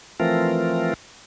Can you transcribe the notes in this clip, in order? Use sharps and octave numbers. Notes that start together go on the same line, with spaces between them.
E3 F3 A3 C4 F4 A#4